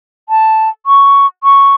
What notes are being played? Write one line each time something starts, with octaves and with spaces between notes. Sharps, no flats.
A5
C#6
C#6